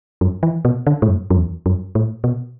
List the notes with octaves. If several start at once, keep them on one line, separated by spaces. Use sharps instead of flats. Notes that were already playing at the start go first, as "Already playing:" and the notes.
F#2
E3
B2
D3
A2
F#2
F#2
E2
F#2
A2
B2